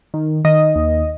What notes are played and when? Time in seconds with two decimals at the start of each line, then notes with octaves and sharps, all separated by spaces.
0.14 D#3
0.45 D#3 D#5
0.75 D#2